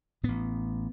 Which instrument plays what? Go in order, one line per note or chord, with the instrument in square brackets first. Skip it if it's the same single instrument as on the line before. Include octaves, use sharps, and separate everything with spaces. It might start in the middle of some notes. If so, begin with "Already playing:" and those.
[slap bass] A1 A2 B3